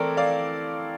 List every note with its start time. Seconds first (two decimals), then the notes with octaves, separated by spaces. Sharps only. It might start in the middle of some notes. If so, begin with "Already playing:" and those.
Already playing: E3 A3 C4 A4 A#4 D5
0.17 D5 F5